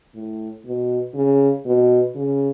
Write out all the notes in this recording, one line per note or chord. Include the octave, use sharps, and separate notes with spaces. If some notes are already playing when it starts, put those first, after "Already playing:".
A2
B2
C#3
B2
C#3